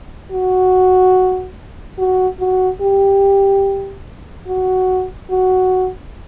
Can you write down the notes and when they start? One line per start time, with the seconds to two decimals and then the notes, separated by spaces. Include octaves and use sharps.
0.32 F#4
1.98 F#4
2.40 F#4
2.82 G4
4.47 F#4
5.30 F#4